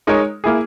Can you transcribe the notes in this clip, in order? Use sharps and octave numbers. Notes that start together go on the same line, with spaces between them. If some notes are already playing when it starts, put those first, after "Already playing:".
G#3 D#4 A#4 C#5
A#3 E4 G#4